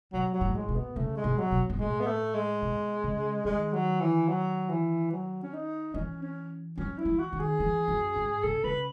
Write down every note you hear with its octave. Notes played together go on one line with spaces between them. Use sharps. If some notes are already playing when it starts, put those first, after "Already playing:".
B2 F#3
F#3
A2
G#3
B2
B3
C#3 A3
G#3
B2
F#3
B2
G#2
A2 G#3
B3
A3
G#3
B2
C#3
D#3 G#3
F#3
E3
F#3
E3
F#3
C#4
D#4
E3 C#4
C#4
F#3 C#4
E4
E3
F#4
D#3
G#4
E3
F#2
G#2
C#3 A4
C#3 B4